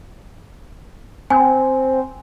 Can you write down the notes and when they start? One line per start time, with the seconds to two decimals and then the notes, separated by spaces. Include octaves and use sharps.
1.30 C4 G#5